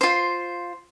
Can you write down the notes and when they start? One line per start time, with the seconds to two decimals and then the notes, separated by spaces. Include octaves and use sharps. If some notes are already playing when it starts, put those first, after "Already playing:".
0.01 F4 C5